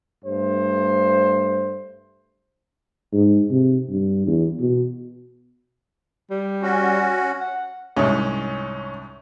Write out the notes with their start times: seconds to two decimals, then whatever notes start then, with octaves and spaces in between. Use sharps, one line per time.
0.25 G2 A3 C5
3.13 G#2
3.51 C3
3.90 G2
4.27 E2
4.59 B2
6.30 G3
6.62 C#4 F#4
7.40 F#5
7.97 C2 G#2 C#4